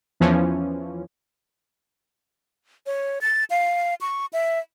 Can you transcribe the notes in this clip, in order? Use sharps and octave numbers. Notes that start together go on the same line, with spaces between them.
E2 E3 F3 C#4
C#5
A6
F5
C#6
E5